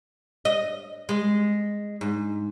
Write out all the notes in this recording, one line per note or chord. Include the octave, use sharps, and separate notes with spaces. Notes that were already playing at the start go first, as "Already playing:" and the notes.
D#5
G#3
G#2